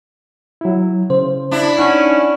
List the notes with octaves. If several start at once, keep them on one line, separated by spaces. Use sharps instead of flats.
F#3 E4
C#3 C5
D4 E4
C#4 D#4 F#5